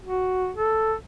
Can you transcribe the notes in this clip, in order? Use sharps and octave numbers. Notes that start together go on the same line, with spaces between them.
F#4
A4